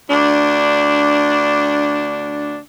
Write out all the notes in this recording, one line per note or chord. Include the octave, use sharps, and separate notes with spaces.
D2 D4